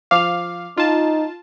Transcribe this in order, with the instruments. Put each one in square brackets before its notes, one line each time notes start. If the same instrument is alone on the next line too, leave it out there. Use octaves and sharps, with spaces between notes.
[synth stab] F3 F5 [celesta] D6 F7
[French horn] D#4 [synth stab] F4 A5